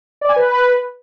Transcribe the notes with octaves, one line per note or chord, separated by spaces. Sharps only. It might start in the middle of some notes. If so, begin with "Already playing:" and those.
D5
G#5
B4